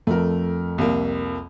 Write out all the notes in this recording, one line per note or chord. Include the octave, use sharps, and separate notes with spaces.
F2 A3 A#4
C2 A#3